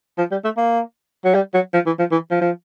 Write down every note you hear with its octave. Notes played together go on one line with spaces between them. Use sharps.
F3
G3
A3
A#3
F#3
G3
F#3
F3
E3
F3
E3
F3
F3